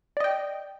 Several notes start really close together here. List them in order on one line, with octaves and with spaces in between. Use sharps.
D5 D#5 G5